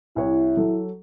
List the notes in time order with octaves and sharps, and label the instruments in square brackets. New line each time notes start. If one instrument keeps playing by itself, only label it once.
[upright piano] C2 C#5 [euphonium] E4
[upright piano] F#3 A4